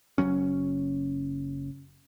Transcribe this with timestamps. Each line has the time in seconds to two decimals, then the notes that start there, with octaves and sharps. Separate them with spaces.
0.18 F#1 F#2 F#3 C#4